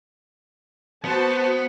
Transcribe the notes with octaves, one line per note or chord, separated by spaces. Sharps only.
B3 F#4 C5 A5